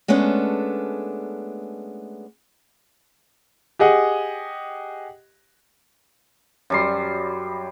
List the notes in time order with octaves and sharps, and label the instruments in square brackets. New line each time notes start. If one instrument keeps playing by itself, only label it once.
[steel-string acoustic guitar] G#3 A3 B3 C#4 D4
[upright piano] G4 G#4 D#5 F#5
[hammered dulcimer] F#2 G3 C6